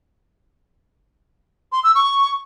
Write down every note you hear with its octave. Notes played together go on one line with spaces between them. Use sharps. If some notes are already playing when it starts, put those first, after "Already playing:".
C6
E6
C#6